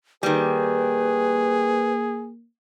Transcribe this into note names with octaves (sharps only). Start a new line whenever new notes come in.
D#3 G3 A#3 G#4 B4